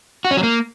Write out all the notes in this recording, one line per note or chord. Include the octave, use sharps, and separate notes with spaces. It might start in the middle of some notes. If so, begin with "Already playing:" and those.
F#4
C#4
F#3
A#3